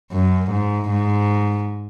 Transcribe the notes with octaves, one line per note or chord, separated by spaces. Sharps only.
F#2
G#2
G#2